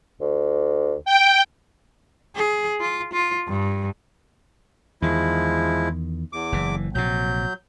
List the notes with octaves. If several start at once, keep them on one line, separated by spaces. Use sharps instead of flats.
D2
G5
G#4
F4
F4
G2
E2 D#3 F3 G#3 E4
E2 D6
F#1 E3
A#1 C3 F#3 G6